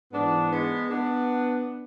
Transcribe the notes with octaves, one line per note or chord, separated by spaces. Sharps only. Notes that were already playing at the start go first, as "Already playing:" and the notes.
G#2 E3 B3 D4
G#3 B3
B3 D4